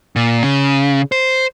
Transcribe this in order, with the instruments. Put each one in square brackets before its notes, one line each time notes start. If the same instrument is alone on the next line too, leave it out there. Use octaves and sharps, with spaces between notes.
[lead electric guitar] A#2
C#3
C5